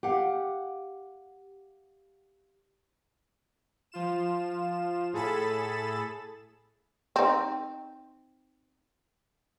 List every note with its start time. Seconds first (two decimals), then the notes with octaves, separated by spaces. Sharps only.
0.03 G4 F5 F#5
3.92 F3 F4 E7
5.13 A2 G#4 A4 B5 A6 E7
7.16 C4 D#4